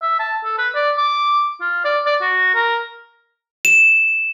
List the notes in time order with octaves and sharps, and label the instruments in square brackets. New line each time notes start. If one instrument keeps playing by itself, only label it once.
[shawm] E5
A5
A4
B4
D5
D6
F4
D5
D5
F#4
A#4
[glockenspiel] E7